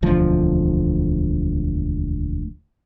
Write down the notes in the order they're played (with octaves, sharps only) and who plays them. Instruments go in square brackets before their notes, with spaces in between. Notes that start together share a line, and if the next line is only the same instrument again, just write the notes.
[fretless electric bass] E1 D2 F3